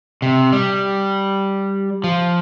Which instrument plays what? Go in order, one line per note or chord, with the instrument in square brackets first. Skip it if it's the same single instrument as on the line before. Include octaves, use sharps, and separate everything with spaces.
[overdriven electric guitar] C3
G3
F3